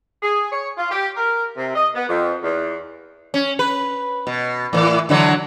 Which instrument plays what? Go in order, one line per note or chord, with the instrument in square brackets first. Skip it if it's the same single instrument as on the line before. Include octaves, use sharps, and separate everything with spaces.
[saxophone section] G#4
C#5
F4
G4
A#4
C3
D#5
B3
F2
E2
[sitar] C#4
B4
B2
A2 E3
D3 E3 F#3